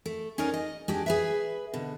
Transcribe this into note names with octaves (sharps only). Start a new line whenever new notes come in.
A3
C#4 D#4 G#4 A#4 D5
D#5
G#3 D4 G4 G#4
G#4 B4 E5
B2 D3